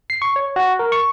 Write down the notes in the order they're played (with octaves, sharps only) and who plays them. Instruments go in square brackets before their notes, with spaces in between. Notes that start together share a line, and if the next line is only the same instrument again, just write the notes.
[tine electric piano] C7
C#6
C#5
F#4
A#4
C#6